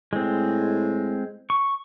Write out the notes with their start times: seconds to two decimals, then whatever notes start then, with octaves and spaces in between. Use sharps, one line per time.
0.13 A2 G#3 C4
1.50 C#6